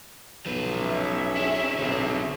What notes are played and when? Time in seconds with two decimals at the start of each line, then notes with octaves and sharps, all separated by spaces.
0.46 B1 F3 B3 B4
0.80 C#4 E5
1.37 D4 E4 G#4
1.79 B1 D3 C4